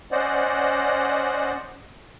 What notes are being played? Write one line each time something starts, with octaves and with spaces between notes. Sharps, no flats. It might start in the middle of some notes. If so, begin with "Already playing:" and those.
C#4 C5 D5 D#5 F#5